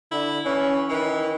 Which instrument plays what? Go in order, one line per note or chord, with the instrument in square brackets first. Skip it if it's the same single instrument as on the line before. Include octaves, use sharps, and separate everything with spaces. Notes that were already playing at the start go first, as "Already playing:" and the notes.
[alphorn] D3 [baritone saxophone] E4
[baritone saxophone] E3 [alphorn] C#4
[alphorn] D#3 [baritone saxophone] E3